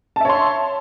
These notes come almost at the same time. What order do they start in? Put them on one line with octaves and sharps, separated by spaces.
A5 E5 C#5 C6